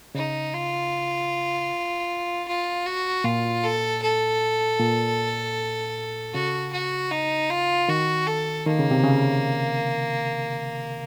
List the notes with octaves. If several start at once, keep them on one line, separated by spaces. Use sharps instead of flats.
C#3 D#4
F4
F4
F#4
A#2 F4
A4
A4
A#2
C#3 F#4
F#4
D#4
F4
D#3 F#4
A4
D#3 A#3
C#3
C3
C#3